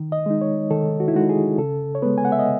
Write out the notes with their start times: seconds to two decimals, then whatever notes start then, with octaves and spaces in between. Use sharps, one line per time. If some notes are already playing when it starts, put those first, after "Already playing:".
Already playing: D#3
0.12 D#5
0.26 G#3 D#4
0.41 C#5
0.71 D#3 A4
1.00 F#4
1.08 E4
1.14 G#3 D#4 F#4
1.29 G#4
1.58 C#3 A4
1.95 C#5
2.02 G#3 B3 B4
2.18 G#5
2.25 F#5
2.32 E5
2.39 D#5